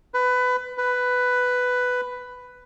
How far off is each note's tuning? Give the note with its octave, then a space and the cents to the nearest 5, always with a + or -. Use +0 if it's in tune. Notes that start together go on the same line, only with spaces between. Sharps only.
B4 +20
B4 +10